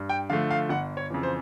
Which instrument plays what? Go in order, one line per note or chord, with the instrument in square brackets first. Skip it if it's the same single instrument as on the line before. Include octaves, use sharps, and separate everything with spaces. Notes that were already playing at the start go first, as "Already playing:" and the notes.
Already playing: [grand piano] G2
G5
D3 F3 A3 F5
F5
G1 F#5
C#5
F2 C#3 E3
C5